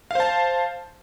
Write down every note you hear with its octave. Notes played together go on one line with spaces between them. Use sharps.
C5 F5 A5